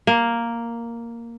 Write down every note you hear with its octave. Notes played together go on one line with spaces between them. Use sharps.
A#3